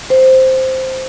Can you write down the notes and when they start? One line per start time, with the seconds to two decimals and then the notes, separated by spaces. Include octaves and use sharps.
0.10 C5